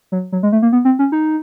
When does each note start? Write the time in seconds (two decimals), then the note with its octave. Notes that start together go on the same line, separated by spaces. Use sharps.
0.12 F#3
0.32 F#3
0.43 G#3
0.52 A3
0.62 A#3
0.72 B3
0.85 C4
0.99 C#4
1.12 D#4